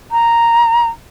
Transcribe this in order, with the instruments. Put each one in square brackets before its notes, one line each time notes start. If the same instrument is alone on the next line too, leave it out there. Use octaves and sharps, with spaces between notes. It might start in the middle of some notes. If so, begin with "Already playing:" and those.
[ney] A#5